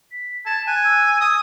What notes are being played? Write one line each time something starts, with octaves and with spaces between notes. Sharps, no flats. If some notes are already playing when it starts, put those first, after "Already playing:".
B6
A5 G#6
G#5 F#6
E6
D#6